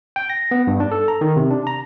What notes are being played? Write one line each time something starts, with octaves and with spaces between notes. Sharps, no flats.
G5
A#6
B3
G2
D4
A4
A#5
D#3
C3
D4
A#5